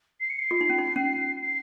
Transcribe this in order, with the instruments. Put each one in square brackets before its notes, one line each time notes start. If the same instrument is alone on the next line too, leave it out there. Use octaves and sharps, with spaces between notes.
[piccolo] C7
C#7
C7
[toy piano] F4
D#4
C#4
D#4
C#4
[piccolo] C7